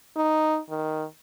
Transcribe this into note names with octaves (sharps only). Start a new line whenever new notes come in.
D#4
D#3